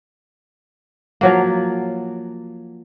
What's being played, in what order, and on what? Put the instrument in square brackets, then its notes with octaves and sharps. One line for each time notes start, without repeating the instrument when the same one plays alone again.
[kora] F3 F#3 A#3